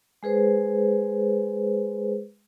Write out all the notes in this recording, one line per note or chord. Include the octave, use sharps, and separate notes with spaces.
G#3 G#4 B4 C5